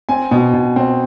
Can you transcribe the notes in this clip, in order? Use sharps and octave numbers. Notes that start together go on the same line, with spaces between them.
C4 G#5
B2
B2
C4